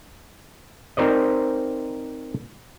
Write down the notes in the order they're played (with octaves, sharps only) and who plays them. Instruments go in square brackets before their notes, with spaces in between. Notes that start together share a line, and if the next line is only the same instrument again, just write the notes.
[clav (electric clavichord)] C4 D#4 A#4 C5 D5 D#5